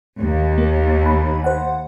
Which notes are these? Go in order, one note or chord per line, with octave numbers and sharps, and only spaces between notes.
D#2
A#3
B5
C5 F#5